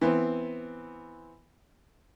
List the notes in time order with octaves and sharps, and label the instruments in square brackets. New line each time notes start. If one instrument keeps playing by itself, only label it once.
[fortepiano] E3 B3 C4